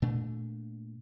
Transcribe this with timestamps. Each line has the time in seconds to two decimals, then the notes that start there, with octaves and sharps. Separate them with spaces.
0.02 A#2 A3 D4